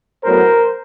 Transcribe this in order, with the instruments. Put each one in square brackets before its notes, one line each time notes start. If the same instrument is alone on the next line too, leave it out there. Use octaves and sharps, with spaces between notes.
[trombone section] A2 F#3 B3 A#4 C5